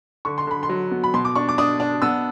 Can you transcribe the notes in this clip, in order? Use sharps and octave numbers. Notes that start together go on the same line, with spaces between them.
D3 C#6
C6
D3 B5
C6
F#3
B3
B5
B2 C6
D6
D4 C#6
D6
D4 D#6
D4
B3 E6